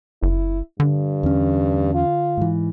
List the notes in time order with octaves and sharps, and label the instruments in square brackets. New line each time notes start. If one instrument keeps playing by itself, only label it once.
[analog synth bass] F#1 [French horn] E4
[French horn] G2 [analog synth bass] D3
[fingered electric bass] E2 C#4
[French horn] F4
[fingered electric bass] G#2 E3